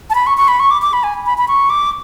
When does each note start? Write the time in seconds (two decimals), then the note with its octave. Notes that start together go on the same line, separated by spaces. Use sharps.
0.10 A5
0.15 B5
0.27 C#6
0.37 C#6
0.48 B5
0.60 C#6
0.71 D6
0.82 D6
0.93 B5
1.04 G#5
1.26 B5
1.38 B5
1.48 C#6
1.70 D6